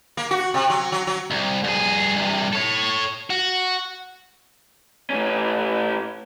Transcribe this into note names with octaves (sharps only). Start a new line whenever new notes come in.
A#3
F#4
C3
F#3
F#3
F#3
C2
G2 G#4
G2 C3
A4 C#5
F#4
A2 C#4